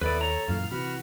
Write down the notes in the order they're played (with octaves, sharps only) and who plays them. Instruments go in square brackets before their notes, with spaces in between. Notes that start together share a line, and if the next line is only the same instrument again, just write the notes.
[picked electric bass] D#2 [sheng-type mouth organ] B3 E4 B5 [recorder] A4 [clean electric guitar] B4 D5
[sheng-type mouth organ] C#5 [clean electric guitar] A#5
[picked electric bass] F#2 A#2 E3 [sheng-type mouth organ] F5
[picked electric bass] C3 E3 [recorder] F#4 [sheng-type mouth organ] B5 F6